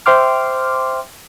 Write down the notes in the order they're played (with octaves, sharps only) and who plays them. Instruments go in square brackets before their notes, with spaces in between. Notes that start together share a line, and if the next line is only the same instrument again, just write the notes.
[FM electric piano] C5 E5 G5 C6 D6 F6